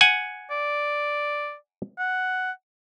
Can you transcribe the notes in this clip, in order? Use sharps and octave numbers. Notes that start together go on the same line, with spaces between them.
F#5 G#5
D5
F#5